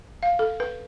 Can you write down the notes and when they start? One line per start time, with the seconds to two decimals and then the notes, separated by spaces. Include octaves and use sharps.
0.23 F5
0.39 A4
0.60 B4